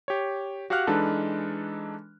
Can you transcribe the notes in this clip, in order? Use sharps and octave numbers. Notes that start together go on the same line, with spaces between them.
G4 C#5
F#4 G4 F5 F#5 F6 F#6
E3 G#3 D4 D#4 A4 B4